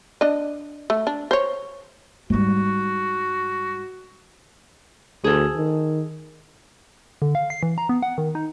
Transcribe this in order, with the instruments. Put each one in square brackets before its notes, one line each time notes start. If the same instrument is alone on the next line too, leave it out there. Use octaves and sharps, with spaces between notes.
[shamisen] D4 D#5
A3
D4
C5 C#5
[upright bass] G#2 G3 [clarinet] F#4
[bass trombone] D2 [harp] G#4 A4
[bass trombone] D#3
[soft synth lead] D3
F5
C7
E3
A#5
B3
F#5
D#3
D#4